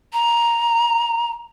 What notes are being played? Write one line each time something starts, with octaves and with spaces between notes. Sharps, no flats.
A#5